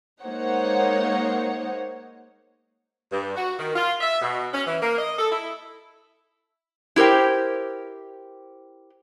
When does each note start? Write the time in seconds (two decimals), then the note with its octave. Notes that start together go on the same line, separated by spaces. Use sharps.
0.22 G#3 A#3 D#4 C5 C#5 F#5
3.12 G2
3.36 F#4
3.59 D#3
3.76 F4
4.01 E5
4.22 B2
4.54 C#4
4.67 E3
4.82 A#3
4.99 D#5
5.19 A4
5.32 E4
6.96 E4 G4 A#4 C5 G5